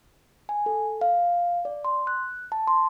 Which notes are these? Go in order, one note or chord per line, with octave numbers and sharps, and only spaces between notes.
G#5
A4
F5
D5
C6
F#6
A5
C6